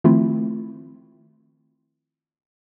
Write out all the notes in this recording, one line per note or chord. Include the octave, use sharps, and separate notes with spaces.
D#3 F3 A3 C4 E4 F4